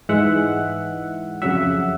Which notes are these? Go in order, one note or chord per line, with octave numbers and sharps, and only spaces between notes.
G#2 E3 G#3 E5 F#5
F2 C#3 F#3 E5 F#5